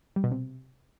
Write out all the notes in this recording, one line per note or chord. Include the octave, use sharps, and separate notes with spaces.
G3
B2
C3